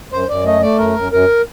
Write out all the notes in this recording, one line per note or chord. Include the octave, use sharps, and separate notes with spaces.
F#2 C5
F#2 D5
A3 D#5
A3 D5
F#2 A#4
F#2
F#2 A#4